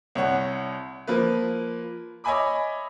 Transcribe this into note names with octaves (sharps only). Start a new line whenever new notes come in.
C2 C#5 F#5
F3 A#3 B4
C#5 D#5 E5 G#5 B5 D6